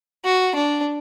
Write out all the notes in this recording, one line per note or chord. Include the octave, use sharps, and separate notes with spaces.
F#4
D4